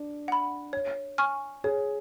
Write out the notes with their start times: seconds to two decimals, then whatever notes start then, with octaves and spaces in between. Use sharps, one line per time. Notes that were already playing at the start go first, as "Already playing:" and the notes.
Already playing: D4
0.28 F#5 B5
0.73 C#5
1.18 G#5 C#6 F6
1.64 G#4 C#5